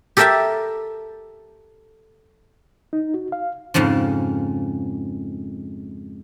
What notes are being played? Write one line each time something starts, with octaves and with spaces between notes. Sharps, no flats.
G4 A4 A#4 E5 G5 A5
D#4
F#4
F5
F2 G#2 C#3 F3